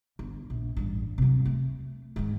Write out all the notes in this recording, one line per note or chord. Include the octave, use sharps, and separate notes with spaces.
G1
A#1
A1 G2
C3 F#3
A3
G#2 D#3